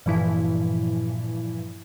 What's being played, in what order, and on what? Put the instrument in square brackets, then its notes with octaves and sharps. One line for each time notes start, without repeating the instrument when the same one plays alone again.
[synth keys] G2 A#2 E3 F3 E4